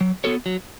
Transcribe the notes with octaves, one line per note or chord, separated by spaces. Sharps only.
F#3
B3 F#4 A4 C#5
F#3